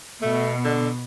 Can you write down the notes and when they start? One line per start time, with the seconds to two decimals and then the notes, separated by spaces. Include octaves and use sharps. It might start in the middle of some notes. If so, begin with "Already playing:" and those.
0.22 B2 A3
0.65 D3